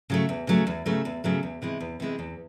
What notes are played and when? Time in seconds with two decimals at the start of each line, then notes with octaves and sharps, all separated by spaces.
0.10 C#3 F#3 A3
0.29 E2
0.47 C#3 F#3 A3
0.67 E2
0.86 C#3 F#3 A3
1.05 E2
1.24 C#3 F#3 A3
1.43 E2
1.62 C3 E3 G#3
1.80 E2
2.00 C3 E3 G#3
2.19 E2